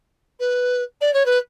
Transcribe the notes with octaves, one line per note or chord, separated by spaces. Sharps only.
B4
D5
C#5
B4